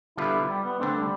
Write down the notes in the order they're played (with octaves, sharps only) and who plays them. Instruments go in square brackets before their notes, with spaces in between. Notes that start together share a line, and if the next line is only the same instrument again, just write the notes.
[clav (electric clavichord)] D3 G3 B3 F4 [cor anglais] E4
[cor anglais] G3
B3
[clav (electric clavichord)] D3 A3 D4 [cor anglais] C4
[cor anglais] G3